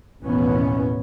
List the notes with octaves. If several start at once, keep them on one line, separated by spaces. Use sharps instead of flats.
A1 D#2 B2 E3 B3 C#4